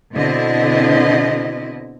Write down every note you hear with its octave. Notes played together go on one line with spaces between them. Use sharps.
B2 D3 C4 E4 D#5